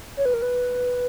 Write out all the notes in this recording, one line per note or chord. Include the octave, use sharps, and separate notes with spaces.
C#5
B4
A#4
B4